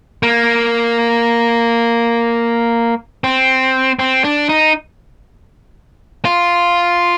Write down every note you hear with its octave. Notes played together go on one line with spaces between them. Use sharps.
A#3
C4
C4
D4
D#4
F4